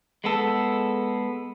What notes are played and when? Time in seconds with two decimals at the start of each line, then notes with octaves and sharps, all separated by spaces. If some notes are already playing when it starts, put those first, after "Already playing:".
0.24 G#3 B3 A4